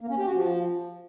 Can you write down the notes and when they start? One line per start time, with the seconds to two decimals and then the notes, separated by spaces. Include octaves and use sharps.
0.01 A#3
0.10 C#4
0.18 G4
0.27 F#4
0.36 F3